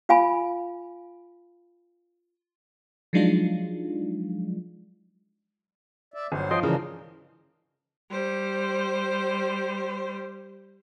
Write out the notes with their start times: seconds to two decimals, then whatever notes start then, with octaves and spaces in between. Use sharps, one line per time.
0.09 F4 F5 G#5 B5
3.13 F3 F#3 G#3 D4 D#4 F4
6.14 D5 E5
6.32 G1 F#3 C5
6.51 F3 D#5 G5 C6
6.63 C#3 E3 G#3 D4 A#4
8.11 G3 C5